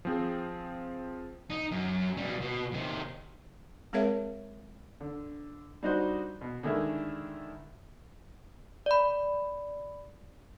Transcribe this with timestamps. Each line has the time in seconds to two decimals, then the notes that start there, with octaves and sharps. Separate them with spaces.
0.05 F3 C4 G#4
1.50 D#4
1.72 F#2
2.17 B2 G3
2.41 B2
2.73 C3 D#3
3.93 G#3 C4 G#4 A#4 C#5 E5
5.01 D3
5.83 G3 D4 D#4 F#4 C5
6.41 B2
6.63 D3 D#3 G#3 A3 D4 E4
8.86 D5 B5